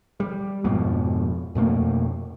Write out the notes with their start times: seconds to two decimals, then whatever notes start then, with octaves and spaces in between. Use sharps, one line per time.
0.20 G3
0.64 F2 G#2 B2 F3
1.55 F2 B2 A3 A#3